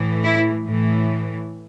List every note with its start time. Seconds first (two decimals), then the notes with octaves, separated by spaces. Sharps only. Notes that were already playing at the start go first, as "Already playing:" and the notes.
Already playing: A2 E3
0.24 E4
0.67 A2 E3